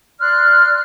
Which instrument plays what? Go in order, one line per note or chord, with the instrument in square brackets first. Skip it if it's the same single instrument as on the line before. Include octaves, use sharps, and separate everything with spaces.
[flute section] D5 C6 F6 F#6